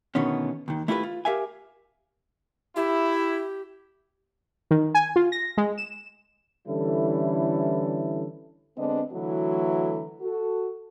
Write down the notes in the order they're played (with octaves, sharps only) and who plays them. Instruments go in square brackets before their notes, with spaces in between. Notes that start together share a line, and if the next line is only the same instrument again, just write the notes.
[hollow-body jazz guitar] B2 D3 D#3 A3 B3 C#4
D#2 D#3
A3 E4 F4 G4 A#4 B4
F4
G4 A#4 E5 F5 G#5
[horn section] E4 [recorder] G4
[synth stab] D#3
G#5
F4
A#6
G#3
E7
[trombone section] D3 E3 G3 C#4 E4 A4
[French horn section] D3 G#3 B3 C4 D4 D#5
D3 E3 F#3 A3 E4 F#4
F#4 A4